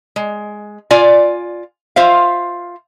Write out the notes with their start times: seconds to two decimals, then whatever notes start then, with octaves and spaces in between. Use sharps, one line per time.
0.16 G#3
0.91 F4 D5 G#5
1.96 F4 C5 E5 F5